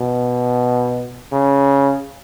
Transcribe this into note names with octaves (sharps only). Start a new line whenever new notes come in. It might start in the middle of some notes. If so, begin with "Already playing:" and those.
Already playing: B2
C#3